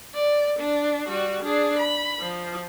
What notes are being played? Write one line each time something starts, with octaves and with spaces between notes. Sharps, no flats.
D5
D4
G3 F#4
D4 G#4
B5
F3